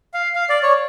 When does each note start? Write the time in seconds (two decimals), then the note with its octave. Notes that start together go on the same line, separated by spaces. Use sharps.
0.14 F5
0.35 F5
0.49 D5
0.63 C#5